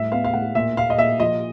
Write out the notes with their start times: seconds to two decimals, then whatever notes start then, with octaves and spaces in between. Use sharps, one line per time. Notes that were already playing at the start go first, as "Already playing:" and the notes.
Already playing: A2 G3 E5
0.12 B3 F5
0.24 F5
0.33 A2 F#5
0.55 A#2 E5
0.76 A#2 F5
0.90 D#5
0.98 A#2 E5
1.20 F3 D#5